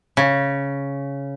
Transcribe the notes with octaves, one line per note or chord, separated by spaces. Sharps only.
C#3